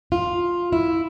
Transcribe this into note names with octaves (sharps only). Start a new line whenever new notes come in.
F4
E4